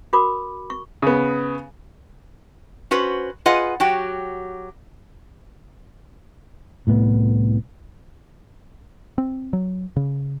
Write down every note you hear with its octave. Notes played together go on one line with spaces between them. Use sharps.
F#4 A#4 B5 D6
C#6
C#3 B3
C#4 F#4 B4 C5
F4 G#4 B4 D#5 F#5
F#3 F#4 G4 G5
C2 A2 A3 B3
C4
F#3
C#3